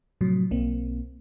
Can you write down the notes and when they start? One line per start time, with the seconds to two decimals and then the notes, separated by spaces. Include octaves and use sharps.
0.21 A2 C3 F3 F#3
0.51 B1 A#3 C4